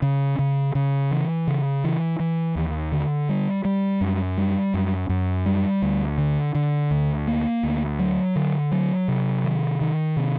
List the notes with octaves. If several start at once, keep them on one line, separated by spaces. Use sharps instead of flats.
C#3
C#3
C#3
E3
C#3
E3
E3
D#2
D3
G3
G3
F#2
G3
F#2
F#2
G3
D2
D3
D3
D2
A#3
D2
F#3
D3
F#3
C3
D#3
D#3
C3